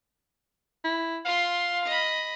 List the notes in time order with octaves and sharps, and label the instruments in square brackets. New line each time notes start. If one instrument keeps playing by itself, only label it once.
[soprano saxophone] E4
[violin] F4 C6 [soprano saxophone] F5
[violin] D#5 B5